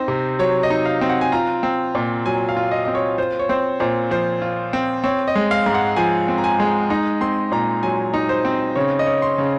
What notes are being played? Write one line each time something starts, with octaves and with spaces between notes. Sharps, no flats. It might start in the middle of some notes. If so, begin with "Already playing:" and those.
Already playing: C4 D#4 C5
C3
F#3 C#5
D#5
D#4
F5
C4
F#5
G#5
F4 A#5
C4
A#2
F#3 G#5
F5
F4
D#5
C4 D#5
C#5
F4 C5
C#5
C4 C5
A#2 C5
F3 C5
F4
C4
C4 C#5
D#5
G#3
F5
G#2
F#5
F3 G#5
C4
A#5
G#5
G#3
D#4 A#5
C4 C6
A#2 A#5
F#3 G#5
D#4
C5
C4
C#3 C#5
D#5
C#4
C6
C#3